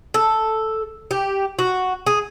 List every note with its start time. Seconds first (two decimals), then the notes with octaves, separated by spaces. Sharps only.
0.14 A4
1.11 G4
1.59 F#4
2.07 G#4